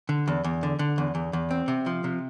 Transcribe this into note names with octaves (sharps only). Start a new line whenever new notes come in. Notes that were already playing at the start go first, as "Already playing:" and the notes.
D3
E2
E2
D3
D3
E2
E2
E2
C4
C3
F3
C3